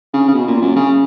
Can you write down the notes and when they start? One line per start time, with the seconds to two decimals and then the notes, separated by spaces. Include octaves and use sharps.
0.14 C#3
0.29 C#3
0.34 B2
0.47 A#2
0.62 F#2
0.76 C#3